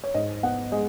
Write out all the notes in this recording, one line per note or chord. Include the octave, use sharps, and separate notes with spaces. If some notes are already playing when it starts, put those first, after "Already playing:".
C#5
G#2 D#5
B3 F#5
G#3 D#5